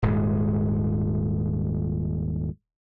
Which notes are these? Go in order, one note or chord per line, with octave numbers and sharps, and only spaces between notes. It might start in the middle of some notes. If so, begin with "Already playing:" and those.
D#1 G#2 G#3